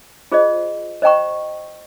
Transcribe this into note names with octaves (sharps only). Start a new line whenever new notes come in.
F4 G#4 C5 D#5
C5 D#5 G5 A#5 C#6